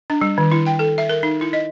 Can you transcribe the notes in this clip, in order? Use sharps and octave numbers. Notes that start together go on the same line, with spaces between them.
D4
G3
D#3
E4
G5
A4
E5
A#4
D#4
E4
D#5